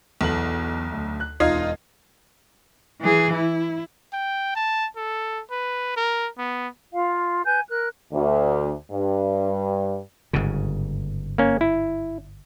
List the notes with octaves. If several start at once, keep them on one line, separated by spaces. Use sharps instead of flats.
B1 E2 A4 F#7
D2
F#6
E1 D#4 F4 D#5 G#6 C7
E3 G#4
E4
G5
A5
A4
B4
A#4
B3
F4 F5
B4 G#5 G6
A#4 F#6
D2
G2
G1 G#2 C#3
A#3 C#4
E4